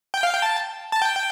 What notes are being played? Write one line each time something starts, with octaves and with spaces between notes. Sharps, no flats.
G5
F5
G5
A5
A5
G5